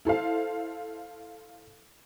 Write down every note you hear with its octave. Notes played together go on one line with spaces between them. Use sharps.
E4 A4 C5 F5